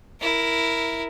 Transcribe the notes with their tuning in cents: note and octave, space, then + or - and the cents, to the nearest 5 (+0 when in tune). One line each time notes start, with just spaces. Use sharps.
E4 +0 A#4 +0